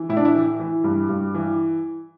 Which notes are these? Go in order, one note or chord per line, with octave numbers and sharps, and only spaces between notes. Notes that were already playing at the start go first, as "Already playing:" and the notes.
Already playing: E3
A2 E4
D4
E4
E3
E3
G2
G2
E3